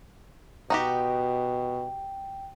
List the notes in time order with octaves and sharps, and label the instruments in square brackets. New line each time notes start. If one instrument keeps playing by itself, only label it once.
[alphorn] B2 [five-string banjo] D#4 F#4 G4 [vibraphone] G5